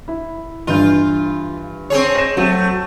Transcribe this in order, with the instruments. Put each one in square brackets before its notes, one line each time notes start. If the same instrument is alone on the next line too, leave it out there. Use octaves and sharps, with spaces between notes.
[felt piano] E4
[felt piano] G2 E3 G6 [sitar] F4
[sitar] C4 G#4 C#5
[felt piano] A#6 E7
[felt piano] F#3 C4 [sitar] A3